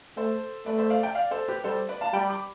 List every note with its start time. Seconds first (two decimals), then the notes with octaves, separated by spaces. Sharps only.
0.17 A3 A4 C5
0.66 A3 B4 D5
0.78 C5 E5
0.90 D5 F5
1.03 E5 G5
1.15 D5 F5
1.31 A4 C5
1.48 G4 B4
1.64 G3 A4 C5
1.89 B4 D5
2.01 F5 A5
2.13 G3 G5 B5
2.30 B5 D6